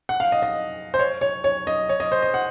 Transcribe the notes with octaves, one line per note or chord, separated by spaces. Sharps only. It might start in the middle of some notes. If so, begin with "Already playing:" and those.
F#5
F5
D#5
D#5
C5
C#5
C#5
C#5
D#5
C#5
D#5
C5
D#5
F#5